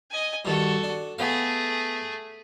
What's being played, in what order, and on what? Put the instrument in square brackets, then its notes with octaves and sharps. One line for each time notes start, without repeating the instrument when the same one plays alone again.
[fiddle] D#5 G#5
[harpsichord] G2 D#3 [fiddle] F#4 A4
[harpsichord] D4
[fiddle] A3 G#4 [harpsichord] B3 F5